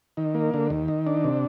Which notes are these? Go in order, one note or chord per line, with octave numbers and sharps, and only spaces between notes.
D#3
A#3
D3
D#2
D#3
D4
C3